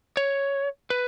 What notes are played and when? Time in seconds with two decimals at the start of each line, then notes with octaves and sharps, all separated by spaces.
0.17 C#5
0.90 B4